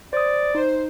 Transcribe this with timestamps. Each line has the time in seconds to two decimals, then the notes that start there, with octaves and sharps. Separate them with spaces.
0.13 C5 D5 D#6
0.55 D#4 C5